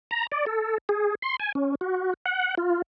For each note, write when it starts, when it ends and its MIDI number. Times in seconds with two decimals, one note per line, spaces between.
0.11 0.27 82
0.32 0.45 74
0.46 0.78 69
0.89 1.15 68
1.22 1.36 84
1.40 1.52 80
1.55 1.75 61
1.81 2.14 66
2.26 2.55 78
2.57 2.82 65